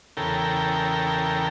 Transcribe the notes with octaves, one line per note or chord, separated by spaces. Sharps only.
E2 C#3 A4 A#4 G5